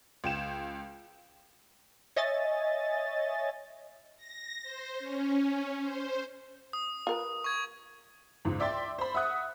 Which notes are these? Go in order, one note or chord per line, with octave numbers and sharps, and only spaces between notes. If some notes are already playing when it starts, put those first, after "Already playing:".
C#2 G5 E7
C#5 D#5 E5 G#5 A6
A#6
C5
C#4
C5
D#6
F4 A#4 B4
C#6 G#6
C#2 G#2
D5 E5 G5 C6 A6
C5 B5
E5 F#5 D#6 F#6